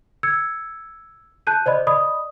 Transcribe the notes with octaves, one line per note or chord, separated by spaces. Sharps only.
E6 G#6 C#7
A5 F#6 G6 D#7
C5 D5 D#5 B5
D5 D#5 B5 D#6